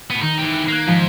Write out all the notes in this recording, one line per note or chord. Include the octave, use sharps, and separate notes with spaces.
A2 B3
D#3 D#4
E3 G4
F#6
A#3 F#6 G#6 C7
G#2 F3